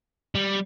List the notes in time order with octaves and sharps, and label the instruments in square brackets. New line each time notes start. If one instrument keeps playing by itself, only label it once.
[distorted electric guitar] G3